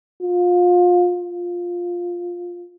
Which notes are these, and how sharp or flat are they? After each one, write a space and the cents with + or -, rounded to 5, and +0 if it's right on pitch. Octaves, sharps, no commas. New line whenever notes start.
F4 +25
F4 +10